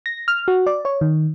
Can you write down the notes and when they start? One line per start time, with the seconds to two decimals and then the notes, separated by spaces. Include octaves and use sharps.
0.06 A#6
0.28 F6
0.48 F#4
0.66 D5
0.85 C#5
1.01 D#3